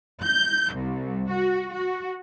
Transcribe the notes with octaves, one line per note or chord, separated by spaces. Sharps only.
G6
C2
F#4
F#4